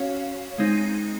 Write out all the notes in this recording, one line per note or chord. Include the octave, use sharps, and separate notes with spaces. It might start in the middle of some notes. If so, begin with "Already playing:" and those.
Already playing: C#4 F#4 C#5 F5
G#3 C4 D#4